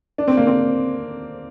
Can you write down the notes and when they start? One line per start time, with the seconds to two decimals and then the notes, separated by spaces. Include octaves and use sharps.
0.18 D4
0.28 C4
0.37 A#3
0.47 C4